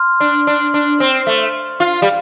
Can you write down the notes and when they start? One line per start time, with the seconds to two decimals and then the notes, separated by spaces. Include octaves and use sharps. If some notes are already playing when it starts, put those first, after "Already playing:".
Already playing: C6 F6
0.20 D4
0.47 D4
0.74 D4
1.00 C4
1.27 A3
1.80 F4
2.02 G3